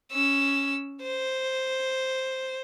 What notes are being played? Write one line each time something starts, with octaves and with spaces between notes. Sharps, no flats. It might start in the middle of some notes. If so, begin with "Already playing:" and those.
C#4 E6
C5